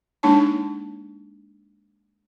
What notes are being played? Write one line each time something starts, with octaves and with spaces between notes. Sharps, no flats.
G#3 A#3 D4 D#4 C#5 A5